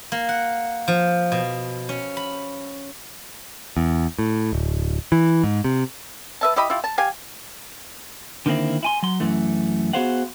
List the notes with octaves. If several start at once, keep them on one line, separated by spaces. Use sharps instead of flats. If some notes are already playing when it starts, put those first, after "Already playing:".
A#3
F#5
F3
B2
C#4
B5
E2
A2
D1
E3
G#2
C3
B4 E5 A5
E4 G4 D#5 B5
E4 F4 G4
A5
G4 F5 G#5
D3 D#3 A#3 C4 E4
E4 G#5 C6
F#3 C6
F#2 E3 A3
B3 F#4 G#4 C5 F5 F#5